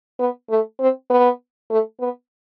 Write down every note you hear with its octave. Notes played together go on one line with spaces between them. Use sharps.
B3
A3
C4
B3
A3
B3